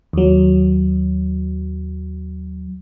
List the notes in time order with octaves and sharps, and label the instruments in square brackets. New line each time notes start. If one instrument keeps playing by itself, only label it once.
[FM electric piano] D#2 F#3